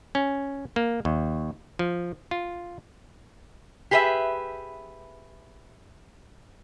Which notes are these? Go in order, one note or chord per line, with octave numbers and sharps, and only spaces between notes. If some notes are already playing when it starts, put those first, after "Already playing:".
C#4
A#3
D#2
F3
F4
G4 G#4 B4 D#5 E5